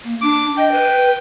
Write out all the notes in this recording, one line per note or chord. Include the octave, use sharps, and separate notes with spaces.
A#3
D4 D6
D#5 G5
B4